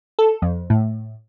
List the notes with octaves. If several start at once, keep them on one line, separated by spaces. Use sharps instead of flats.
A4
F2
A2